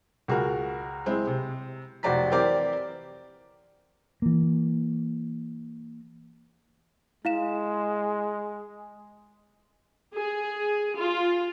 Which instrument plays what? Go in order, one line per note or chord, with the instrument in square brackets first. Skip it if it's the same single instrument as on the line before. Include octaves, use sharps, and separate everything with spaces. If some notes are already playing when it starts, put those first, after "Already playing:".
[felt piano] C#2 F#4 G#4 A#4
G#3 C4 E4
C3
F1 F#4 C5 D5 A#5 B6
E3 C4 G4 A#4 C5 D5
[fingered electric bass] E3 A#3
[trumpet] G#3 [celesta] E4 F5 E7
[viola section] G#4
F4